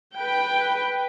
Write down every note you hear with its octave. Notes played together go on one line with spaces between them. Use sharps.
B4 G5